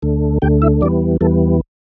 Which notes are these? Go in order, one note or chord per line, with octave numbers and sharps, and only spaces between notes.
D2 D3 A3
D2 D3 A3 G4 G5
E4 E5
E2 E3 G3 B3 D4 D5
E2 E3 G3 B3 A4